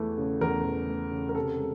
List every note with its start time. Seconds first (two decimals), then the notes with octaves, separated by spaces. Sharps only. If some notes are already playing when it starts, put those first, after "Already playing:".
Already playing: E2 E3 A3
0.17 C#3
0.41 E2 A#4
0.65 E3
0.88 A3
1.11 C#3
1.29 A#4
1.35 C3 A4
1.59 G#3